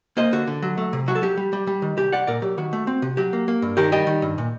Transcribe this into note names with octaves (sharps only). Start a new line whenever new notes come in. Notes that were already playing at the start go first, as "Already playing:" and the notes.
A#3 C5 D#5
D3 F#4
D3
F#3
A3
C3
F#3 F#4
A4
F#3 G4
G3
G3
G3
D#3
C2 G4
C2 D5 F#5
A#2 A#4 D5
F#3 G4
D#3 F#4
A3
C4
C3
F#3 G4
A#3
A#3
G2
D#3 G4 A#4
G3 D#5 G5
D#3
G2
A#2